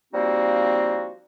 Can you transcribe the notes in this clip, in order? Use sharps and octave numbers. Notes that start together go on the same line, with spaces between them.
F3 G3 A#3 C4 D#4 F#4